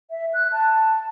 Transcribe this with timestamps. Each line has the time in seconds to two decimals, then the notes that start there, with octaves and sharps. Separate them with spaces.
0.10 E5
0.34 F#6
0.52 A5